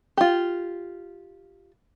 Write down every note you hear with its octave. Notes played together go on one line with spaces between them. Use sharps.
F4 G4